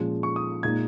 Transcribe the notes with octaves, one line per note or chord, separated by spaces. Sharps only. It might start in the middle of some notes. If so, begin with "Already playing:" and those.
Already playing: A#2 F3 G#3 C#4
C#6
D#6
A#2 G#3 D#4 G#6